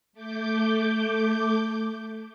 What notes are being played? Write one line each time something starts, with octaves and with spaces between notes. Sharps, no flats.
A3 D6 G6